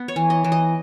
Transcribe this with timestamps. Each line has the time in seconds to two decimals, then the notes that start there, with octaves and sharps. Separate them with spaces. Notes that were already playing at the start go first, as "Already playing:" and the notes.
Already playing: B3
0.08 C#5
0.16 E3
0.30 D#5
0.44 E3
0.52 D#5